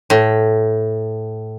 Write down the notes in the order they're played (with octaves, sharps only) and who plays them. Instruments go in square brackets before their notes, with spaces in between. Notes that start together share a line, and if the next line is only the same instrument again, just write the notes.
[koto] A2